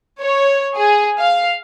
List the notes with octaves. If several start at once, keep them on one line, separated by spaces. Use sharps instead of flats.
C#5
G#4
F5